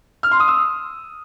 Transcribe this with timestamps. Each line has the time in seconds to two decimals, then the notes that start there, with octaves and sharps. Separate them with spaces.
0.23 F6
0.31 C6
0.40 D#6
0.48 E6